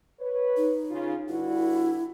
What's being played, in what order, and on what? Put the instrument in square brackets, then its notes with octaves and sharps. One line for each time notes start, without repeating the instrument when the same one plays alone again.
[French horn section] B4 C#5
[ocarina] D#4
[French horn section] C#3 F4
[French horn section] G2 D3 F#4 [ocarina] E4